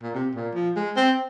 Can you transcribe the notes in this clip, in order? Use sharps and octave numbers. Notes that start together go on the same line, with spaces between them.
A#2
C3
A#2
F3
G#3
C4